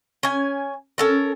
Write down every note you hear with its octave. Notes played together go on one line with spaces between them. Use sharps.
C#4 G#5
C#4 A4 A#4